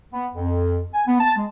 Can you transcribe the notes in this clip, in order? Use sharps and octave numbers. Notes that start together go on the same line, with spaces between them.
B3
F2
G#5
B3
A5
G#3